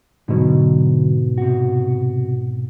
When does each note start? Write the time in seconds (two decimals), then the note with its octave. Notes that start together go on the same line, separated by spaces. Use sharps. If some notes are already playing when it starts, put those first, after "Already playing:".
0.28 G#2 B2 D3 F#3
1.38 C3 F#4